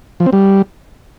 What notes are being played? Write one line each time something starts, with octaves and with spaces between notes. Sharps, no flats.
F3
C4
G3